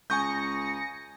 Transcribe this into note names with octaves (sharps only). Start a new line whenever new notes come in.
C#2 G#5 C#6 D#6 G6 A#6 C#7